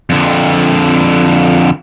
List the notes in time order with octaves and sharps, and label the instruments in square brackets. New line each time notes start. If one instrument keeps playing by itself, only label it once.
[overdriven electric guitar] F2 D3